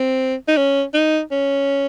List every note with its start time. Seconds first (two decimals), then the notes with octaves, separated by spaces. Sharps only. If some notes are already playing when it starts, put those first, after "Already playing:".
Already playing: C4
0.48 D#4
0.57 C#4
0.94 D#4
1.31 C#4